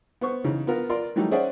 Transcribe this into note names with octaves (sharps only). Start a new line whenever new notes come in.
B3 C5 C#6
C#3 E3 D#4
B3 F4 A#4
F4 A#4 D5 C6
E3 F#3 G3 A3 D#4
C#4 G#4 C5 D5 E5 F#5